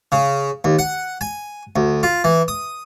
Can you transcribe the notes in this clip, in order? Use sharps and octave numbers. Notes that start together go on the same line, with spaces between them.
C#3
D#2
F#5
G#5
D2
F4
E3
D#6